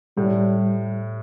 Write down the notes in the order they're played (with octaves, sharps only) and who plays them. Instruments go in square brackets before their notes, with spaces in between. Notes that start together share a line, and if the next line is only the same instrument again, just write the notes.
[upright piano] A2 [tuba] G3